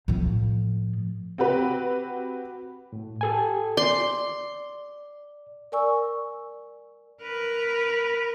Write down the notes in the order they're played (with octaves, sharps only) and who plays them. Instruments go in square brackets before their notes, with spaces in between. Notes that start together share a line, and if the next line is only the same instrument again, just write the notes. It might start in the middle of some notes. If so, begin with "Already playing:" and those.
[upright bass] A2 F3
[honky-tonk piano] C4 F#4 G4 B4
[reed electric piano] A2
G4 A4 G#5
[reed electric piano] D5 [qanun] C6
[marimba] A#4 D5 G#5 C#6 E6
[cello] A#4 B4